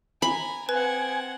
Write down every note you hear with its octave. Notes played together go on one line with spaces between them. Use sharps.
G#5 A#5 B5
C4 B4 F#5 G#5